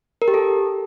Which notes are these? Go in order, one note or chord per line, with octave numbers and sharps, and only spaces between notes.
A#4
G4
A4